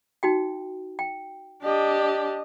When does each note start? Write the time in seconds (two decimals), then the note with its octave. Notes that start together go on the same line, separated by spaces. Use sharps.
0.23 D#4 F#4 G5
0.99 G5
1.63 D4 G4 D#5